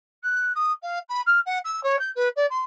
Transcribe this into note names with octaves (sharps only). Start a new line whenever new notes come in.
F#6
D#6
F5
B5
F6
F#5
E6
C#5
G6
B4
D5
C6